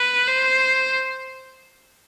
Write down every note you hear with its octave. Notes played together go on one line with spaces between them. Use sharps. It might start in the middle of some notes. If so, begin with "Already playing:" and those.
Already playing: B4
C5